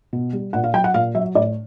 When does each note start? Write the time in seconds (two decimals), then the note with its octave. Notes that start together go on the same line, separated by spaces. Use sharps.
0.13 B2
0.33 G3
0.53 A#2 F#5
0.64 F5
0.74 F#3 G5
0.84 F#5
0.94 A#2 F5
1.15 F#3 E5
1.35 A2 D5